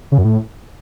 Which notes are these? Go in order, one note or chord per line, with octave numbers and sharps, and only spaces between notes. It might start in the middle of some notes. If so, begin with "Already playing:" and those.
C#3
F#2
A2